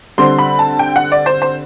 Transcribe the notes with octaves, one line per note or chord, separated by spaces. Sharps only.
D3 G3 C4 C6
B5
A5
G5
F#5
D5
C5
C5